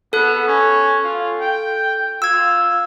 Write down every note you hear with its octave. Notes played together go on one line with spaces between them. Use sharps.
B3 A4 F#6
C#4
F4
G5
F4 E6 G#6